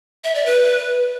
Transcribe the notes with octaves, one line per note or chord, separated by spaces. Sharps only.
E5
D5
B4